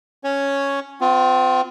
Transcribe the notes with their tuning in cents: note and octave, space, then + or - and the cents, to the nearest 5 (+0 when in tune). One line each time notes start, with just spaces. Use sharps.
C#4 +0 C#5 +0
C4 -35 F4 +15